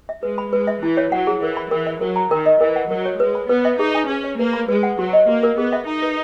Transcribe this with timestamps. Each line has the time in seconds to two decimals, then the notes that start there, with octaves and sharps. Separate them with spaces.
0.09 E5
0.23 G#3 B4
0.38 B5
0.53 G#3 B4
0.67 E5
0.83 E3 E4
0.97 C#5
1.12 F#3 F#5
1.27 G#4
1.42 E3 A#4
1.57 B5
1.71 E3 A#4
1.87 E5
2.01 F#3 A#4
2.16 A#5
2.31 D#3 A#4
2.46 D#5
2.60 E3 A#4
2.76 F#5
2.91 F#3 A#4
3.06 C#5
3.20 G#3 B4
3.35 B5
3.49 B3 B4
3.65 E5
3.79 D#4 G#4
3.95 G#5
4.09 C#4 G#4
4.24 C#5
4.39 A#3 B4
4.53 B5
4.69 G#3 B4
4.83 F#5
4.99 F#3 F#4
5.13 D#5
5.28 A#3 F#4
5.43 A#4
5.58 B3 G#4
5.73 E5
5.87 D#4 A#5
6.02 B4